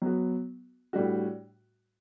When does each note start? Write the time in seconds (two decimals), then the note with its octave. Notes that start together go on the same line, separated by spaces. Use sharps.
0.02 F#3 B3 F#4
0.93 A2 G3 D4 F#4